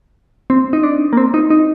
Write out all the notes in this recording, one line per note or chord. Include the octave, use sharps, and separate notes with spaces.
C4
D#4
D4
A#3
C4
D#4
D#4